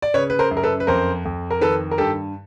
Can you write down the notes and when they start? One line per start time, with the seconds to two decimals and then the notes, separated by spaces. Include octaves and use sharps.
0.02 D5
0.14 C#3 B4 C#5
0.30 B4
0.39 A#4 C5
0.51 F#2
0.57 A#4
0.63 A4 B4
0.80 B4
0.87 F2 A#4 C5
1.25 F2
1.51 A#4
1.61 D#3 A4 B4
1.91 A#4
1.98 G2 G4 A4